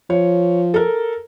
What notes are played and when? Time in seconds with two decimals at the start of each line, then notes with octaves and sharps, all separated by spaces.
0.10 F3 C#5
0.74 A4 A#4